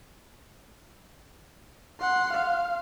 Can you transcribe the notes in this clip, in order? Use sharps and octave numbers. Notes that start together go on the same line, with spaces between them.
F#5 C6
F5